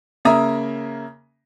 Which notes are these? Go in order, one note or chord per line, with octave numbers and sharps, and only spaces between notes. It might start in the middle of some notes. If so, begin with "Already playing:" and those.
C#3 A#3 E5 A#5 D#6